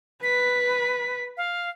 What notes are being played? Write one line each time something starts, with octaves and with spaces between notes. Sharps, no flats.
B4 B6
F5